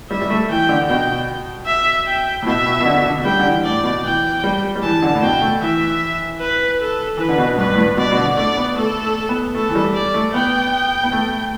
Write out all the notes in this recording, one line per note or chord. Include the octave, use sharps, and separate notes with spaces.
G3 E5
G3
A3
E3 G5
D3
B2 G5
E5
G5
A2
B2 E5
B2
B2
D3
B2
D3
G3 G5
D3
E3
A2 D5
B2
E3 G5
G3
G3
E3 A5
D3
A2
B2 G5
A3
E3 E5
B4
A4
E3 B4
D3
B2
G2 B4
A2
G2
B2 D5
B2
D3
A3 D5
B3
A3 A4
A3
B3
A3 A4
E3
G3
D5
A3
B3 G5
B3
A3